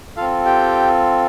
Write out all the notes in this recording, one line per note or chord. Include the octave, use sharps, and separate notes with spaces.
C4 F4 A4 F5
G4 G5